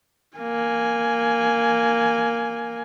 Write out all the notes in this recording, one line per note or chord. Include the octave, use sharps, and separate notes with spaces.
A#3 G#5